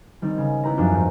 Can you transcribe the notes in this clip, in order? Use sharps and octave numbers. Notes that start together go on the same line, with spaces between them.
D#3 G3 C4 D#4
C#3
B3 E4 G4 B4 A#5
F#2 F3 C4 D4 F4
D#2 G#2